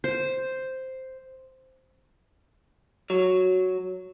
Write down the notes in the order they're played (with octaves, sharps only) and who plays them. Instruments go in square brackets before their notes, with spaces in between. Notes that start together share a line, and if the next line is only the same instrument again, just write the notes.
[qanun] C5
[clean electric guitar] F#3